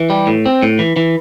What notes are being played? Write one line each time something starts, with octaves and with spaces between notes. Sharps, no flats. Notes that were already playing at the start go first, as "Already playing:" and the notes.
Already playing: E3
G3
A2
C4
A2
E3
E3